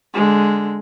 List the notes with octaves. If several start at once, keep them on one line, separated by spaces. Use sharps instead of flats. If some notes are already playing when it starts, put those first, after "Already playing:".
D3 G#3